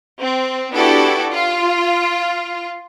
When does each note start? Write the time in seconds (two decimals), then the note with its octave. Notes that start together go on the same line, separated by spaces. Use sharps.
0.21 C4
0.73 B3 D4 E4 F#4 G4 A4
1.32 F4